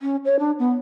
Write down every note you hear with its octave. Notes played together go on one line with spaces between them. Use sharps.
C#4
C#5
D4
B3